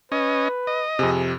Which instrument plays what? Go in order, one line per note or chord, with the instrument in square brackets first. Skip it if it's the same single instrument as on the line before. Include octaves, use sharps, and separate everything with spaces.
[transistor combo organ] C#4 D#5 [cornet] B4
[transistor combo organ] D#5
[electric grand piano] F2 C3 [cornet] G#4